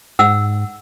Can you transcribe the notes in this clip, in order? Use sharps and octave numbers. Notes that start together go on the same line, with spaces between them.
G#2 F#5 E6